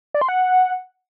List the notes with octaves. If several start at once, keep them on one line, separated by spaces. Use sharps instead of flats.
D5
C6
F#5